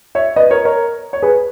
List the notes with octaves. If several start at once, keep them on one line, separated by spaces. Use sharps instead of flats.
C#5 E5
B4 D#5
A#4 C#5
A#4 C#5
C#5
G#4 B4